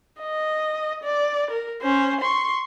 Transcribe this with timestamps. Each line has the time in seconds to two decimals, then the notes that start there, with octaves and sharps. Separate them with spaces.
0.21 D#5
1.03 D5
1.51 A#4
1.82 C#4 C5
2.21 C6 C#6